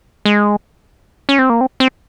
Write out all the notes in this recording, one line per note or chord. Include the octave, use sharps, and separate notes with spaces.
G#3
C#4
C4
A#3
C4
C4